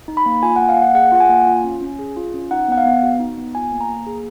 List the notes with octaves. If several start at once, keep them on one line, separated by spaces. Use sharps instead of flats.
D#4
B5
A#3
F4 G#5
F#5
A#3
F5
A#3
F#5
G#4 F#5
F4 F#5
G#5
A#3
F4
C#4
C#4
G#4
F4
C#4
D#4 F#5
B3 F#5
F5
B3
F#4
D#4
B3
F4 G#5
A#3
A#5
A#3
G#4